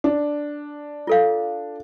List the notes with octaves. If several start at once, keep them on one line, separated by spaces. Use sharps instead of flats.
D4
F4 A4 F5